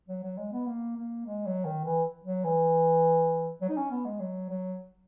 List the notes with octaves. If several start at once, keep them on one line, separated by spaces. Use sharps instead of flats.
F#3
F#3
G#3
B3
A#3
A#3
G#3
F#3
D#3
E3
F#3
E3
F#3
D#4
C#4
B3
G#3
F#3
F#3